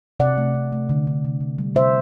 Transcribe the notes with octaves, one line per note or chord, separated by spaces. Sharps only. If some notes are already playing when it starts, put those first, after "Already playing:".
C3 D5 F#5
A3
C3
A3
D3
D3
C3
C3
G3
C3 C5 E5